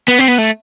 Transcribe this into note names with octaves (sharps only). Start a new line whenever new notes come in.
B3
C4
B3
A3